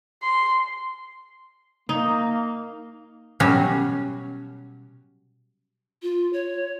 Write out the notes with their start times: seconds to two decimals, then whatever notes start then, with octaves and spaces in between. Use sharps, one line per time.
0.23 C6
1.89 A#3 D#4
3.40 B2 F#3 G3 C#4
6.02 F4
6.33 C#5